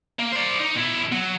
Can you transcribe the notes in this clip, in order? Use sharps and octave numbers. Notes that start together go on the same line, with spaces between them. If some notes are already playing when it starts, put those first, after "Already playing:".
A#3
C5 D5
D#4
B2 E4
F#3